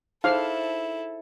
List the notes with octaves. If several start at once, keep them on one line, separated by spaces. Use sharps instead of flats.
D#4 E4 G#4 A4 C5 F5